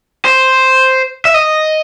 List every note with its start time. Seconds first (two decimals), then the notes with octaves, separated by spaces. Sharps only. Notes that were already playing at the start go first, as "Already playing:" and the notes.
0.25 C5
1.25 E5
1.34 D#5